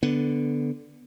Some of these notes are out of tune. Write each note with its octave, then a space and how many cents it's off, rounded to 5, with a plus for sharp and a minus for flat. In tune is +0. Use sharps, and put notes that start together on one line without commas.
D3 +0 B3 +0